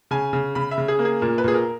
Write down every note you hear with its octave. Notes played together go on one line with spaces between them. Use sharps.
C#3 G#5
C#3
C#3 B5
E5
C#3
G#4
A#3
G#4
A#2 A#4
B4
A#2 G#4
A#4